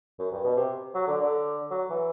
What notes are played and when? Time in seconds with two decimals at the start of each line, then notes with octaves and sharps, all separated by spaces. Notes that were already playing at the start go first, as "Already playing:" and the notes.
0.19 F#2
0.32 G2
0.44 B2
0.57 C3
0.94 F#3
1.07 D3
1.20 D3
1.70 F#3
1.90 E3